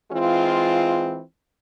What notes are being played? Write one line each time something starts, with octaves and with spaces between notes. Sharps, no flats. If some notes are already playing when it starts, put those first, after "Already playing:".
E3 G#3 C4 F4